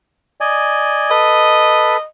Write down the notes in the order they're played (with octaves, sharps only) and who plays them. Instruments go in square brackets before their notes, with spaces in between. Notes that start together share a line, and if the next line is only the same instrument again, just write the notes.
[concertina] D5 D#5 G#5
[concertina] A4 B4 [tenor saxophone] D#5